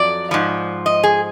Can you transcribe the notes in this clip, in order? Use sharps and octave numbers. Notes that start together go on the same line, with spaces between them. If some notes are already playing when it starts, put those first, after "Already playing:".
Already playing: F2 F#3 D5
G#2 F3
D#5
G#4